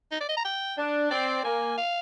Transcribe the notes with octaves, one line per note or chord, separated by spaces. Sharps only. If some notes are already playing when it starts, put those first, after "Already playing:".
D#4
D5
D#5
A#5
G5
D4
C4 D5
A#3 G#5
F5